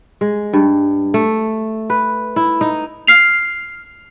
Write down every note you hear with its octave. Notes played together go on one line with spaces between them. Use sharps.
G#3
G2
A3
B4
E4
D#4
F6 C7 F7